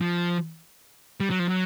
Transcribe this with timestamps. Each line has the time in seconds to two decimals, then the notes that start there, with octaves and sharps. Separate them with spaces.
0.01 F3
1.20 G3
1.30 F#3
1.39 F3
1.49 F#3